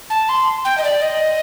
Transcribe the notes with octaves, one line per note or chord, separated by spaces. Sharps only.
A5
C6
G5
D#5
D5
D#5